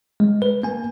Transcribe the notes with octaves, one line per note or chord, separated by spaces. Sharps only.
G#3
B4
A#3 G#5